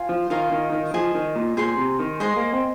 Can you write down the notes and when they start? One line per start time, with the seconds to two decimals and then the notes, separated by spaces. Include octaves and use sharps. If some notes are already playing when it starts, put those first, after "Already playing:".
Already playing: F4 C5 G#5
0.09 F3
0.30 D#3 F4 A#4 D#5 G#5
0.52 D#3
0.72 D#3
0.94 F3 G#4 D#5 G#5
1.15 D#3
1.36 A#2
1.57 A#2 G#4 C5 G#5 C6
1.78 C3
1.99 D#3
2.20 G#3 C5 D#5 G#5
2.37 A#3
2.53 C4